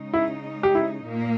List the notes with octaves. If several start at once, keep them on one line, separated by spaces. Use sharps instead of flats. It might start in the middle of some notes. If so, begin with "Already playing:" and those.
Already playing: C#3 G#3 D#4
E4
G4
E4
A#2 A#3